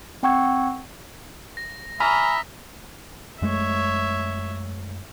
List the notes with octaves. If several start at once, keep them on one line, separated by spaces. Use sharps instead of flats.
C4 F#5 G5 C#6 E6 G#6
A#6
E5 G#5 A#5 B5 D#6 F6 B6
F#2 G#3 A3 C#5 E5